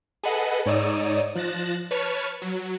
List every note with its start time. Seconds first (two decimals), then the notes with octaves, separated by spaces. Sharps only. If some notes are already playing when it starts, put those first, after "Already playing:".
0.23 G#4 A4 B4 D#5 F#5
0.66 G#2 D#4 C#5 D5 D#6 E6
1.36 F3 F#6 A6 A#6 E7
1.91 B4 C#5 A5 C#6 F6
2.42 F#3